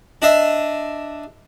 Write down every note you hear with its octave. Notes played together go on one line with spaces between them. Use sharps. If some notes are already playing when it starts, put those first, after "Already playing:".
D4 D#5 E5